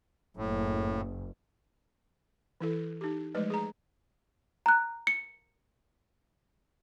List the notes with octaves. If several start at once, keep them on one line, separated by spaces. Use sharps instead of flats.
F#1 A2
E3 E4 A4
D#4 G4
F3 G#3 A3 B4 D#5
G#4 A#5
A#5 F#6
C#7